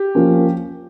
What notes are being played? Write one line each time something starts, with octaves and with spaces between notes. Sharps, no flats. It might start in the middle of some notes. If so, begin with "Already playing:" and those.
Already playing: G4
F3 A#3 C#4